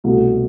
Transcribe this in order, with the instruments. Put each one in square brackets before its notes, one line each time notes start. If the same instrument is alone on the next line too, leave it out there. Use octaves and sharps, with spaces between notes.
[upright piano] C2 B2 F#3 A3